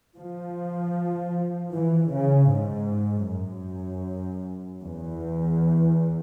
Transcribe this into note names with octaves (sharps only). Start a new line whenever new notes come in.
F3
E3
C#3
G#2
F#2
E2